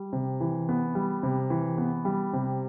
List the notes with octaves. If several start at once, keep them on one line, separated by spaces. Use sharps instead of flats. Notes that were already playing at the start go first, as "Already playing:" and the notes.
Already playing: G3
C3
E3
B3
G3
C3
E3
B3
G3
C3